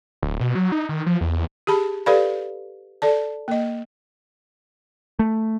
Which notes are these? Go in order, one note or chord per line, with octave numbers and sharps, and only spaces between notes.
D1
B2
F#3
D#4
D#3
F3
E2
G4 G#4 A5 B5
G4 A4 B4 D5 F5 B5
A4 D5 A5
A#3 D#5
A3